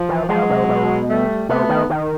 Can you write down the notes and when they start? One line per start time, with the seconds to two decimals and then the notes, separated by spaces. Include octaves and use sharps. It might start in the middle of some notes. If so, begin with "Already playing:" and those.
Already playing: F3
0.09 E3
0.28 F3 F#3 G#3
0.50 C3
0.69 B2
1.09 G3 A3
1.49 C3 A3 B3
1.69 D#3
1.90 D#3